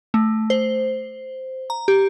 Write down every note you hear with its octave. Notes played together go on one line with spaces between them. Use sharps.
A3
C5
A#5
G4